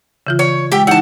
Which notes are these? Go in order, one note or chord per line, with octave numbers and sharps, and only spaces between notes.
C#3 E3 F4
C#5
G#3 G4 E5 G5
E3 D#4 E4 F#5 A5